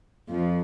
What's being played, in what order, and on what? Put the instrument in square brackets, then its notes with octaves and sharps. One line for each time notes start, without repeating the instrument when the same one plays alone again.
[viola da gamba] F2 F3